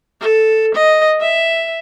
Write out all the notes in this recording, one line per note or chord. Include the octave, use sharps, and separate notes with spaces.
A4
D#5
E5